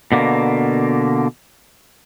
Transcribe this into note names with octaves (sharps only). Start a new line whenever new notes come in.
B2 D3 A#3